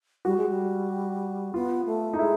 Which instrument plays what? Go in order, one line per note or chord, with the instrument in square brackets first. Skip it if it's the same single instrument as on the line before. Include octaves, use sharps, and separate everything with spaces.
[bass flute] G3 [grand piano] F#4
[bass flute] G#3
G3
[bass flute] B3 [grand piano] F4
[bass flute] A3
[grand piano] D#4
[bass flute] G#3 [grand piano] E4